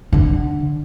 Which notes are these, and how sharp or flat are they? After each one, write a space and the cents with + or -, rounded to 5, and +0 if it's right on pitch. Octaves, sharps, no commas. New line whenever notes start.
D3 +15